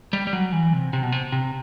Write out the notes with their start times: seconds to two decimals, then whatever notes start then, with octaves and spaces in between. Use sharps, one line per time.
0.13 G3
0.27 G3
0.33 F#3
0.52 E3
0.73 C3
0.93 C3
1.03 B2
1.12 C3
1.32 C3